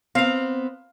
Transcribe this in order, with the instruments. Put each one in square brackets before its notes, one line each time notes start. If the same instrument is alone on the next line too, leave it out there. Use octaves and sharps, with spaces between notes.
[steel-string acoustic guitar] B3 C4 [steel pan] F5